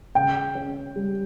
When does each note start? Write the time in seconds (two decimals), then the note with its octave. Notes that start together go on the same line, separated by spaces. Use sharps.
0.15 C#3 G5
0.55 C#4
0.96 G3